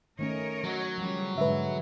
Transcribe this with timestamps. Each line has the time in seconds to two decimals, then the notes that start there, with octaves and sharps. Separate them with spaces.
0.19 D#3 A3 C#4 A#4 C#5 D#5
0.64 F#3
0.98 C#3 F3 G3 F#4
1.38 G#2 B2 D3 G#3 B4 E5